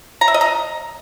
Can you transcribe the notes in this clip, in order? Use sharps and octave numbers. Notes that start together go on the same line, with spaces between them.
A#5
E5
D#5
A#5